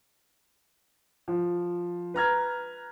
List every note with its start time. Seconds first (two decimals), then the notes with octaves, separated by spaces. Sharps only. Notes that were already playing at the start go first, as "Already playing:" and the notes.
1.28 F3
2.14 B4 A#5 F6 G#6